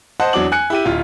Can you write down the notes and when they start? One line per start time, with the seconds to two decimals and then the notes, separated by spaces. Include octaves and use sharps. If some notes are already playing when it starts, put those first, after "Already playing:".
0.20 C5 D#5 F#5 A5
0.33 E2 F#3 D4 D6 F#7
0.52 G#5 F#6 C#7
0.70 E4 G4 D#7
0.85 D1 F4